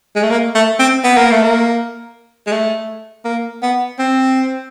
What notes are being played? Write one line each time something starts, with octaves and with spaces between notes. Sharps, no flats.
G#3
A3
A#3
A3
C4
B3
A#3
A3
A#3
G#3
A3
A#3
B3
C4